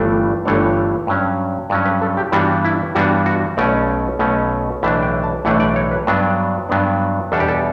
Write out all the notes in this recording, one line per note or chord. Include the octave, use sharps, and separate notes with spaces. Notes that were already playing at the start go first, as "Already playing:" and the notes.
Already playing: G1 G2 E3 A3 D4
G1 G2 E3 A3 D4 C#5
G2 F#3 C#4
G2 F#3 C#4 D5
B4
A4
G4
G2 E3 G3 B3 D4 F#4
E4
G2 E3 G3 B3 D4 F#4
F#4
B1 B2 A3 C#4 D5
B1 B2 A3 C#4
B1 A2 E3 A3 D4 E5
G5
A5
B1 A2 E3 A3 D4 F#5
D5
C#5
B4
G2 F#3 B3 D4
G2 F#3 B3 D4
E2 B2 G3 D4 A4
G4
A4